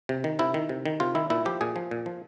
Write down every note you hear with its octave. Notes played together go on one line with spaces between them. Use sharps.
C3
D#3
C3 E4
D#3
C3
D#3
C3 F4
D#3 E4
A#2 E4
F3 G4
A#2 G#4
F3
A#2
F3